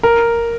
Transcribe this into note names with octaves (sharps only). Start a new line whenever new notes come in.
A#4